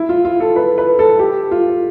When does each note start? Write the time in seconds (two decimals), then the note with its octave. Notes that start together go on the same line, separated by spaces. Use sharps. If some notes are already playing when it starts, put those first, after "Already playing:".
Already playing: E4
0.09 F4
0.25 F4
0.40 A4
0.56 B4
0.78 B4
0.99 A4
1.19 G4
1.51 F4